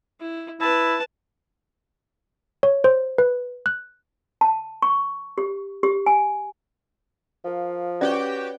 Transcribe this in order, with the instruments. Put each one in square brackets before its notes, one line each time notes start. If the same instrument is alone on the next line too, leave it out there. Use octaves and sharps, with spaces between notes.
[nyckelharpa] E4
[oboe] E4 [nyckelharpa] B4 A5
[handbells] C#5
C5
B4
F#6
[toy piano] A5
C#6
G4
G4
G#5
[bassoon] F3 [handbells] A#4 F5
[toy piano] C#4 D5 [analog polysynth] F#4 G4 G5 [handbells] B4 C#5